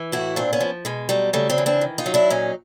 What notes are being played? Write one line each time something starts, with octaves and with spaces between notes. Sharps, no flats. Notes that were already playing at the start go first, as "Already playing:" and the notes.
Already playing: E3
A2 E4 F#4
A#2 C4 D4
B3 C#4
F3
B2 G#3
F#3 G3 A3
C#3 G3 A3
C4 D4
E3
C4 D4
D#3
D#4 F4
F#3
D4 E4
A#2 C#4 D#4